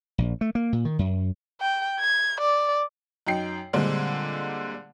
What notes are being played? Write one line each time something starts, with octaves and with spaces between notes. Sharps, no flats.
A#1
A3
A#3
A#2
D#3
F#2
G5
G#6
D5
F#2 D#4 G5 C7
A#2 D3 G3 G#3 C4